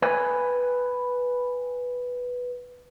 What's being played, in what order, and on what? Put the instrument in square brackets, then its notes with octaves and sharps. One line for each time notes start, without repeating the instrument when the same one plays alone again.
[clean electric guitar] B4 G5 G#5